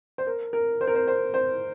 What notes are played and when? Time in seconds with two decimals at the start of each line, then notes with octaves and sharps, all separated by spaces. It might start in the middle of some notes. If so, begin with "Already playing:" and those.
0.18 C5
0.27 A#4
0.53 A#4
0.81 C5
0.87 A#4
0.95 C5
1.08 C5
1.34 C5